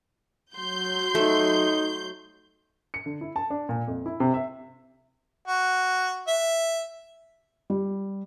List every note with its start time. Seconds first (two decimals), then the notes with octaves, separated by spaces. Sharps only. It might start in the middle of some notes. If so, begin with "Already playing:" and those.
0.56 F#3 C6 G6
1.15 A3 D#4
2.94 C#7
3.06 D3
3.21 E4
3.36 A5
3.50 D4
3.69 A#2
3.88 F2
4.06 E4
4.20 C3
4.34 E5
5.47 F#4
6.28 E5
7.70 G3